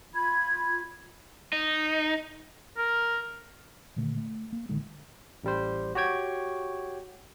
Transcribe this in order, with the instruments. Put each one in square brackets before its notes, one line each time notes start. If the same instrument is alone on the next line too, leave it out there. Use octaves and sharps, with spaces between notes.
[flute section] F4 B5 G#6
[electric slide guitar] D#4
[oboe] A#4
[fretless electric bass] A#2 D3 D#3 A3
A3
A#3
A1 D3 D#3 G#3
[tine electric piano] A1 G3 C5
F#4 G4 C#5 G5 G#6